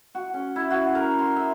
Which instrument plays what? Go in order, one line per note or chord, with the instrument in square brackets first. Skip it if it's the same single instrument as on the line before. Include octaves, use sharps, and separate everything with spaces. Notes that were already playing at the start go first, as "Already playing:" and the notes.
[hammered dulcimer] F#4
C#4
E4
F#4
A#4
C6
E5